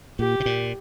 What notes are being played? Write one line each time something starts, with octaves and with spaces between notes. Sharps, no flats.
A#2 G4
C3
A#2